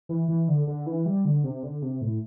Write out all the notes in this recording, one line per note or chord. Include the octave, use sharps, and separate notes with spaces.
E3
E3
D3
D3
E3
G3
D3
C3
D3
C3
A2